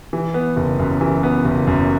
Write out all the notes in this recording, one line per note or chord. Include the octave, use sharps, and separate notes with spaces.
E3
B3
F#1
F#2
E3
B3
F#1
F#2